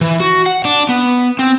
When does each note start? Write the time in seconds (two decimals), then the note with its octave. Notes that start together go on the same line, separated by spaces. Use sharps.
0.01 E3
0.20 F#4
0.46 F#5
0.65 D4
0.89 B3
1.39 C4